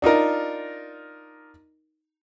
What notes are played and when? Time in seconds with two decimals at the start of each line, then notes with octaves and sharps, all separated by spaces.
0.02 D4 D#4 F4 A#4